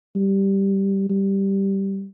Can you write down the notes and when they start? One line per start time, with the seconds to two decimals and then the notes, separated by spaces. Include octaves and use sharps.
0.16 G3
1.09 G3